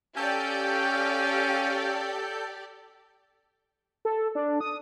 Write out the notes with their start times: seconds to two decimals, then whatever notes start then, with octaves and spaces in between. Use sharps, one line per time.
0.17 C#4 G4 A4 D5 F5 G5 G6
4.05 A4
4.35 D4
4.61 D#6